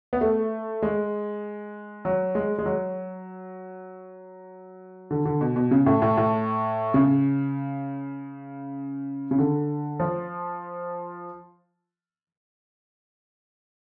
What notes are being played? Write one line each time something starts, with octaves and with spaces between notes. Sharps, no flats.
B3
A3
G#3
F#3
G#3
G#3
F#3
D3
D3
B2
B2
C#3
A2
A2
A2
C#3
C#3
D3
F3